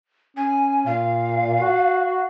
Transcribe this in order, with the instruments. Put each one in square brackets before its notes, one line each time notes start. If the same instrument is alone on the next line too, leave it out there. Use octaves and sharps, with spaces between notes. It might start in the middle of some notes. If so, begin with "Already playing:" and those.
[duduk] C#4 [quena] G#5
[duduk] A#2 [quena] F5
[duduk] F#4